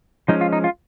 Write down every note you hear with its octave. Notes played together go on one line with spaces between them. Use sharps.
F3 G#3 C#4 D#4
F4
D#4
F4